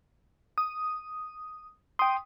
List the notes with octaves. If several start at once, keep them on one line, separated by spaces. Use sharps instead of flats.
D#6
G5 C6 D#6